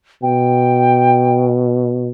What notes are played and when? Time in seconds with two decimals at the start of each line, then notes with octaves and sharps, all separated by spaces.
0.23 B2 G5